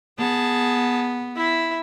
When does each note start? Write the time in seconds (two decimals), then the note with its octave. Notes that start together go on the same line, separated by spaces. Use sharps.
0.18 B3 G#4 A5
1.36 E4 E5